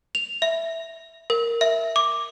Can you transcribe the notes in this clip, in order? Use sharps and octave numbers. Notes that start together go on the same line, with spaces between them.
F7
E5
A#4
E5
D6